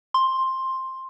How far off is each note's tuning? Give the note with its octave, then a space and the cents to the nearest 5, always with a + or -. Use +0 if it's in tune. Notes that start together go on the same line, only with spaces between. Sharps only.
C6 +10